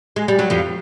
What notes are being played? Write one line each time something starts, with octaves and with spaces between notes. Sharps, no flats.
G#3
G3
F#3
F2 F3